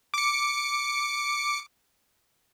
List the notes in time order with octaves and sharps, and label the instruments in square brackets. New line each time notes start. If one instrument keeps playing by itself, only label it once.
[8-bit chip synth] D6 C#7